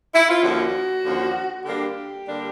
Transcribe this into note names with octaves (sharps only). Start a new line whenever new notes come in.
E4
F4
D#2 D3 F3 A#3 C#4 F#4
D#2 D3 F3 A#3 C#4
D3 G3 A#3 D4 G4
D3 G3 A#3 D4